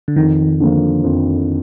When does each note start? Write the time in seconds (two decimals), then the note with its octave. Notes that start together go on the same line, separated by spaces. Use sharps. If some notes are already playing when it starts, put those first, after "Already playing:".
0.08 D3
0.16 F2 D#3
0.60 D3 F3 A#3
1.04 F2